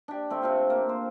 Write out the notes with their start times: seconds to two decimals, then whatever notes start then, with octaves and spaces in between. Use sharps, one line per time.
0.08 D4 G4
0.30 A3 C4
0.42 C3 A3 F4
0.70 A#3
0.89 C5